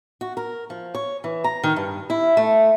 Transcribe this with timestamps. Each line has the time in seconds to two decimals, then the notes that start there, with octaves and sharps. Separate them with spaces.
0.21 F#4
0.37 A#4
0.70 F3
0.95 C#5
1.24 E3
1.44 A#5
1.64 D#3
1.76 G2
2.10 E4
2.37 A3